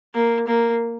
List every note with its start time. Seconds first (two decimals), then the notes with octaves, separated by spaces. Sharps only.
0.14 A#3
0.48 A#3